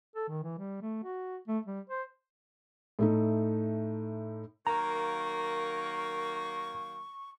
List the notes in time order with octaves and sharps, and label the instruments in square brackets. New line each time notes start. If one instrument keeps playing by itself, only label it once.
[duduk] A4
D#3
E3
G3
A3
F#4
A3
G3
C5
[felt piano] A2 A3 D#4
[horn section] D#3 F#3 A#3 [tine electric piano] A#5 [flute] C#6